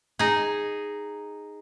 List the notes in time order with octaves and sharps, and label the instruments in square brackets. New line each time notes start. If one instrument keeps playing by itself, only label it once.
[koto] D#4 G#4